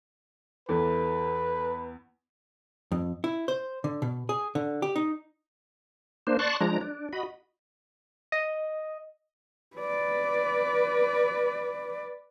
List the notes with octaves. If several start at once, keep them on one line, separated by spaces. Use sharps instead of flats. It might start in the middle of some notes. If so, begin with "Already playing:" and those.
E2 E3 A4 B4
F2
E4
C5
D3
B2
G#4
D3
G4
D#4
A#3 D4 C5
D5 A5 C6 C#6 F#6
F3 G#3 D4 A#5
D4
F#4 D#5 B5
D#5
B4 D5